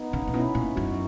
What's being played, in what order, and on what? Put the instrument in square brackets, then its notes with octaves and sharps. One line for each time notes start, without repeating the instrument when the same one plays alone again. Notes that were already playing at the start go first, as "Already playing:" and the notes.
Already playing: [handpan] B3 D#4
[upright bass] C#3
A#2
[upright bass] B2 [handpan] C#4 E4
[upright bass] A#2
[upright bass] F#2 [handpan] D#4 F#4